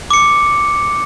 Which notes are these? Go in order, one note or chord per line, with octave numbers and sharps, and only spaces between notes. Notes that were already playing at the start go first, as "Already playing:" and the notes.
D6 C#7